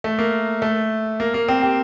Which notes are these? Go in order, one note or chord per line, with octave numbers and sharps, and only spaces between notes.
A3
A#3
A3
A#3
A#3
C4
G4